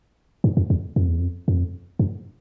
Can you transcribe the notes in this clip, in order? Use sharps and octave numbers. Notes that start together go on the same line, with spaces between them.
G2
F2
E2
F2
E2
F2
F2
F#2